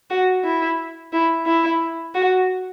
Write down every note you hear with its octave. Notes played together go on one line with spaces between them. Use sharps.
F#4
E4
E4
E4
F#4